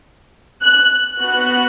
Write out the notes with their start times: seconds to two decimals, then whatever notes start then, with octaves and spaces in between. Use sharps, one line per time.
0.62 F#6
1.20 B3 F#4 F#6